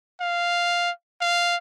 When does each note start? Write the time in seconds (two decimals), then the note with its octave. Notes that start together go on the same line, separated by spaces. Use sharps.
0.21 F5
1.21 F5